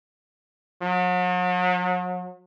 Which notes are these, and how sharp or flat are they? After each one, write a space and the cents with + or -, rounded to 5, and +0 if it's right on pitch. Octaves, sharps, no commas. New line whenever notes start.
F#3 -40